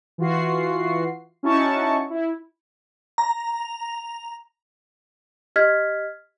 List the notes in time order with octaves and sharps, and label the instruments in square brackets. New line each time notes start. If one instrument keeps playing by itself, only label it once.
[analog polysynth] E3 F4 F#4 C7
C#4 D#4 E4 F#4 A5 C#6
E4
[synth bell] A#5
[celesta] G4 D#5 F6 G#6 B6